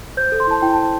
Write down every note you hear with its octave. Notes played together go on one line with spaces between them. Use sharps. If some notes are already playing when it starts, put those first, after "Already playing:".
C5 G6
A4
C6
E4 A5
E4 G5
C5 A5